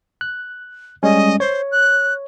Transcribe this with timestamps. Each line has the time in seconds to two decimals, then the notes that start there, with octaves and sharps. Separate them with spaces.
0.21 F#6
1.03 G3 G#3 C#4 D#5
1.40 C5 C#5
1.71 F#6